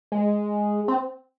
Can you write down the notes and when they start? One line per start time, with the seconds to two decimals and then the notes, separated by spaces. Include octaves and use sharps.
0.12 G#3
0.88 C4